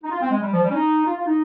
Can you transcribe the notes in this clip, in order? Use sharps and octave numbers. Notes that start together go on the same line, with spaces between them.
D#4
F4
C4
G#3
G3
F3
G3
C#4
D#4
F4
F4
D#4